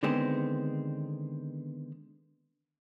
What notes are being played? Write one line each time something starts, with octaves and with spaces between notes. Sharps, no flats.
D3 D#3 G#3 B3 C4